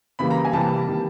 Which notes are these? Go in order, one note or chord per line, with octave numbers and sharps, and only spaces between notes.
C#3 E3 G3 A#3 B5
A#5
G#5
C3 E3 G3 A#3 A5
D#3 G3 A#3